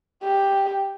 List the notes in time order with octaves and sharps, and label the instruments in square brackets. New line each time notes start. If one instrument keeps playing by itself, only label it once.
[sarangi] G4